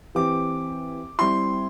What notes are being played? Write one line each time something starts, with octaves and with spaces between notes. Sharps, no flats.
E3 C4 G4 D6
G3 C4 E4 C6